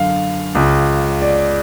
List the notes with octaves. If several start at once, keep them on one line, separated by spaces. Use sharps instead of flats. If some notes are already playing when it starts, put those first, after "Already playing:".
Already playing: F#2 D3 F5
C#2 C#3
D5